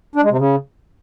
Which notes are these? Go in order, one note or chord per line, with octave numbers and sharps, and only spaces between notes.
D4
G#3
C3
C#3